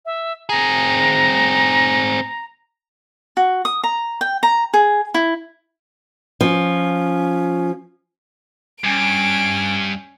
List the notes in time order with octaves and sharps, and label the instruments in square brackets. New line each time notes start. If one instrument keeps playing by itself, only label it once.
[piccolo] E5
[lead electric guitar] C4 G#4 [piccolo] A#5
[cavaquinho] F#4
D#6
A#5
G5
A#5
G#4
E4
[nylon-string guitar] F3 [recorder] C#4
[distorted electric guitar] G2 [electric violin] C#4 G#5 [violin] D7